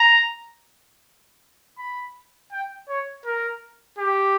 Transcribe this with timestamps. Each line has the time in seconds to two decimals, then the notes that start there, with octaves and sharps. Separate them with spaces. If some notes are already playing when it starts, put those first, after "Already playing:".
Already playing: A#5
1.78 B5
2.52 G5
2.89 C#5
3.25 A#4
3.98 G4